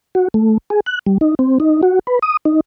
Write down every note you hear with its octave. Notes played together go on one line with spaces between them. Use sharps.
F#4
A3
G#4
F#6
G3
D#4
C4
D#4
F#4
B4
D#6
D#4